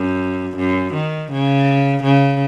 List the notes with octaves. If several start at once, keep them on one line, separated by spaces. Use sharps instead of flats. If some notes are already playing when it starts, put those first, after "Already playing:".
Already playing: F#2
F#2
D#3
C#3
C#3